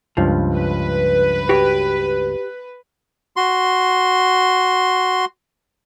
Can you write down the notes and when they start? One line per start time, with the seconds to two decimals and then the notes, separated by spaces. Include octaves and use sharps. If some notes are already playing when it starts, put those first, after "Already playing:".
0.17 C#2 G2 F3
0.55 B4
1.49 F#4 G4 C#5
3.37 F#4 C6